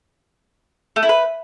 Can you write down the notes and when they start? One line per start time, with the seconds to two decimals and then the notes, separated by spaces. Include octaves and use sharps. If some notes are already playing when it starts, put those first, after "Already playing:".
0.96 A3
1.03 E4
1.09 B4